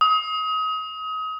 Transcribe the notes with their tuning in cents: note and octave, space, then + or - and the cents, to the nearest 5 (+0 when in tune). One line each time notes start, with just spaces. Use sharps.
D#6 +30